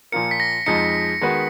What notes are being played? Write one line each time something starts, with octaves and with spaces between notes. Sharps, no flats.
A#2 F3 A#3 F4 A#4 C#7
B6
A#6
F2 F3 G#3 D#4 C#7
D#3 G#3 B3 F#4 B4